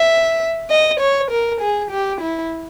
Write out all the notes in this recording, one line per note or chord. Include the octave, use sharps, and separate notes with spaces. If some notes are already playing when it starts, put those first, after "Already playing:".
Already playing: E5
D#5
C#5
A#4
G#4
G4
E4